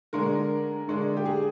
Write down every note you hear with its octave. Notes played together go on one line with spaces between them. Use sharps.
D3 G#3 D4 A#4
D3 G#3 D4
G4
G#4